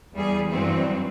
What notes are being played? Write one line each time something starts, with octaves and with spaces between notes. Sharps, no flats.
E2 G3 G#4
G2 E3 F#3 C4